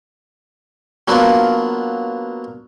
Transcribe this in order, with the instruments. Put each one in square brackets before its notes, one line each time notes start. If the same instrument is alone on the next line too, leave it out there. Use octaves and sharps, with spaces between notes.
[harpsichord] F#3 A#3 B3 D4 F4